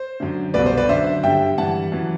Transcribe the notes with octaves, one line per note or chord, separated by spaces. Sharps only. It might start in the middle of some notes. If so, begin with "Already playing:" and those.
Already playing: C5
F#2 D3
C2 B2 B4 D5
C5
B4 D5
F#2 D3 C5 E5
G2 D3 E5 G5
G2 E3 F#5 A5
F#2 E3